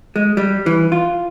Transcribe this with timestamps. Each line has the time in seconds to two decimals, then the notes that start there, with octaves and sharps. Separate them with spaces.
0.16 G#3
0.37 G3
0.66 E3
0.92 F4